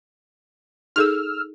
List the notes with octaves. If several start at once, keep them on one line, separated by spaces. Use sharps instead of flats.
D#4 G#4 A4 E6 F6